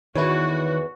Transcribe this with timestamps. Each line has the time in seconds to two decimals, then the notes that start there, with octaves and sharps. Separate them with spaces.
0.15 E2 D#3 E3 E4 F#4 B4 C#5